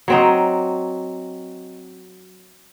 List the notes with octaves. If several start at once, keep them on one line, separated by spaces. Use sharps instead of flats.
F#3 C4 D#4